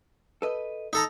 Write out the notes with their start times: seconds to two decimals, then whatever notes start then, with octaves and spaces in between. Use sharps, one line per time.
0.42 A4 B4 D#5
0.93 D#4 A4 A#5